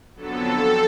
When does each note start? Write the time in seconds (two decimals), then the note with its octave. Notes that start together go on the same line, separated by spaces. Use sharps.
0.15 F2 D3 F#3 B3 A4
0.57 C4